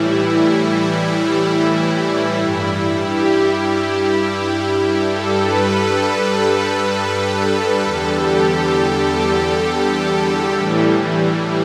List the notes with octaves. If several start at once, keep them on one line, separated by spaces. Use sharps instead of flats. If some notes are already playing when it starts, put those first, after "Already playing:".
Already playing: A2 E3 G3 E4
E4
G2 G3
G4
G2 G3 A4
B4
A4
A4
B4
E2 D3 G3 A4
G4
G4
A2 E3 G3